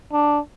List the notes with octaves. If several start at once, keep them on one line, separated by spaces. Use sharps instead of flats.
D4